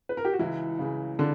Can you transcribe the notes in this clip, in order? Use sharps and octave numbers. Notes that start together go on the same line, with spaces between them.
B4
A#4
G4
F#4
C#2 E3 E4
C#3 E3
D3 D4